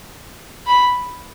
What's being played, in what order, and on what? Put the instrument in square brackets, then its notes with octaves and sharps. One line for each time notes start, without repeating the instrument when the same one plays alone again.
[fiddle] B5